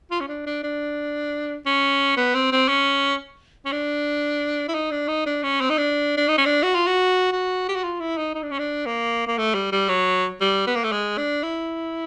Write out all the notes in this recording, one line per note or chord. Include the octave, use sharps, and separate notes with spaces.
F4
C#4
D4
D4
D4
C#4
B3
C4
C4
C#4
C#4
D4
E4
D#4
D4
D#4
D4
C#4
C4
D#4
D4
D4
D#4
C#4
D4
F#4
F4
F#4
F#4
G4
F#4
F4
E4
D#4
D#4
D4
C#4
D4
A#3
A#3
A3
G3
G3
F#3
G3
B3
A#3
A3
G#3
D4
E4